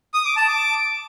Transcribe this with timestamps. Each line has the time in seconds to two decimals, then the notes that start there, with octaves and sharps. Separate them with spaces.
0.14 D#6
0.25 D6
0.36 A5
0.48 D6